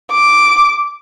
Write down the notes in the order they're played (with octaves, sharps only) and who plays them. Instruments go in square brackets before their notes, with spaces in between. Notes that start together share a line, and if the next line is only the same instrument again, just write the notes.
[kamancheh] D6